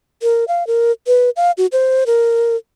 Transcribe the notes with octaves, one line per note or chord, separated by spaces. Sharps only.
A#4
F5
A#4
B4
F5
F#4
C5
A#4